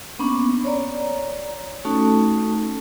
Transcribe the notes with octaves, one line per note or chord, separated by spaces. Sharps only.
A#3 B3 C#4 D4
C#5 D5 A#5
A3 C#4 D#4 F#4 A4 A5